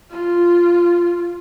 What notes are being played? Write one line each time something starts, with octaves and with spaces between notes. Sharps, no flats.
F4